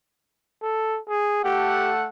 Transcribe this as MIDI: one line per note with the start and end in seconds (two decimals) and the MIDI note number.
0.62 0.99 69
1.08 1.44 68
1.44 2.08 57
1.44 1.92 67
1.44 2.08 69
1.44 2.08 78